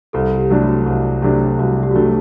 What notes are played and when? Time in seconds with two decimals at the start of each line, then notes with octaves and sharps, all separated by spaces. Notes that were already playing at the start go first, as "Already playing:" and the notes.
0.13 C2 A4
0.38 G4
0.50 C3 F#3 A3 D4
0.62 F#4
0.86 C2
1.22 C3 F#3 A3 D4
1.59 C2 F#4
1.83 G4
1.91 F#4
1.95 C3 F#3 A3 D4 G4